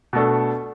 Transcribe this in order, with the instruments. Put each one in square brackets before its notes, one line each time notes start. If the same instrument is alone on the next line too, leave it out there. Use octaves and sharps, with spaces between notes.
[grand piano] B2 A3 D4 A4